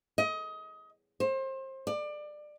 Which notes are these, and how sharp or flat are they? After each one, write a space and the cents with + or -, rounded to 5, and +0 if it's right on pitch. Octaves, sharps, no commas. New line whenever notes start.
D#5 +25
C5 +30
D5 +25